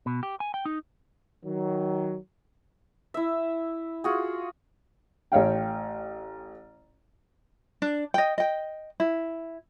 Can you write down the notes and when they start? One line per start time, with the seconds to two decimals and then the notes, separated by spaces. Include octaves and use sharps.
0.06 B2
0.23 G4
0.40 G#5
0.54 G5
0.65 D#4
1.45 D#3 F#3
3.14 E4 E5
4.04 F4 F#4 G#4
5.32 A1 C#5 F5 G5
7.82 D4
8.14 D#5 G5
8.38 D#5 G5
9.00 E4